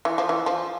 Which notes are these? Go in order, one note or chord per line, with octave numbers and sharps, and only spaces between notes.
E3
F3
E3
F3